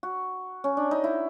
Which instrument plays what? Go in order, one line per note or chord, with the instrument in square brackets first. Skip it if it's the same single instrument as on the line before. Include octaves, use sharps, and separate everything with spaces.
[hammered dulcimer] F#4
C#4
D4
D#4
E4